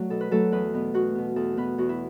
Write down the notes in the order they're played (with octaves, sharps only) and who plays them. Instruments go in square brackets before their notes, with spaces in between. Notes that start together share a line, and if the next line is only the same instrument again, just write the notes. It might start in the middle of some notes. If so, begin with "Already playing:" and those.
Already playing: [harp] F#3 A3 F#4 D5
B2 A4
B4
F#3 A3 A4
E2 B4
B2 B3
E2 F#4
B2 B3
E2 A4
B2 B3 B4
E2 F#4
E4